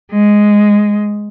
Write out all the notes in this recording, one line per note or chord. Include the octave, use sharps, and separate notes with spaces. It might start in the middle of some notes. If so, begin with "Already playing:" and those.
G#3